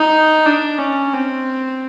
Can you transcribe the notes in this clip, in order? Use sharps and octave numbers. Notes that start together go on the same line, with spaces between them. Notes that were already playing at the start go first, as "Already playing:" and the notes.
Already playing: D#4
D4
C#4
C4